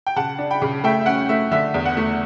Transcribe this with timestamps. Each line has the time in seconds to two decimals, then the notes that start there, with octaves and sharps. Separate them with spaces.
0.07 G5
0.16 C#3 F#5 A5
0.39 D4
0.50 G5 B5
0.62 C#3
0.84 A3 E5 G5
1.01 E5
1.06 C#4 F#5
1.29 A3 E5
1.51 D3 E5
1.74 E2
1.86 F#5
1.97 A3